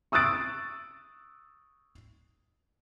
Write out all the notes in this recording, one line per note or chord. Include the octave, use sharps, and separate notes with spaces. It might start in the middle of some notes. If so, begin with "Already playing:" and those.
C#6 D#6 E6 F#6 A6 D7